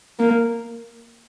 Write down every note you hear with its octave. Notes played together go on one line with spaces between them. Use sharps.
A#3